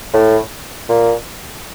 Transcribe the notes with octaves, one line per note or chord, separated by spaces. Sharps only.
A2
A#2